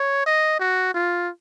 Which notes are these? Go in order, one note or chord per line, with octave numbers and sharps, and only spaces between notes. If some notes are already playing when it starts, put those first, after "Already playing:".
Already playing: C#5
D#5
F#4
F4